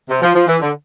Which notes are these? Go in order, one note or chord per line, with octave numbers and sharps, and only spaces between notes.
C3
F3
F3
E3
D3